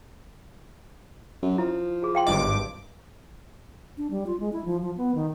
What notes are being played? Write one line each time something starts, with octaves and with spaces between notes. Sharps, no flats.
F#2
F3 E4
F#4 G#4
F5 G5 C6
G#1 G2 D#5 D6
D4
G3
F4
G#3
E4
F3
F3
B3
D#3